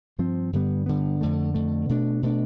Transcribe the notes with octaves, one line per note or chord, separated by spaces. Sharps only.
G2 F3 C4
G2 D3 G3 B3
G2 D3 G3 B3
F2 D3 A3
F2 D3 A3
B2 A3 D4
B2 A3 D4